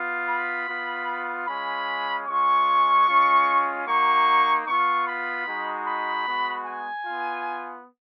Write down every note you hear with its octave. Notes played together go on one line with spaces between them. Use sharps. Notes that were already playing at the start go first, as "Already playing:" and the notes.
Already playing: B3 F4
B5
B3 F4
G#3 C#4 F4 B5
G#3 C#4 F4 C#6
G#3 C#4 F4
A#3 D#4 F#4 C#6
B3 F4 C#6
B5
G#3 D#4 F#4
B5
G#3 B3 F#4
G#5
B3 F4